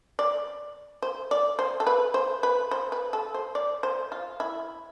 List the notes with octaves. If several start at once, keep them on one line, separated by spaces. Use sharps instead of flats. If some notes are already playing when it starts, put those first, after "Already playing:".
D5
C5
D5
C5
A4
B4
C5
B4
C5
B4
A4
C5
D5
C5
F4
E4